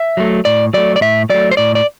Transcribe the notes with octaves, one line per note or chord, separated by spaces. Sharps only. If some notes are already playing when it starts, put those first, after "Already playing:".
Already playing: E5
F#3 A3
A2 D5
F#3 A3 D5
D5
A2 E5
F#3 A3 D5
C5
A2 D5
D5